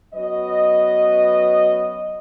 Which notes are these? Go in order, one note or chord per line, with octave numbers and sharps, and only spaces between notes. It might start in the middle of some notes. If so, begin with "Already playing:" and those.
F#3 B3 C#4 B4 D#5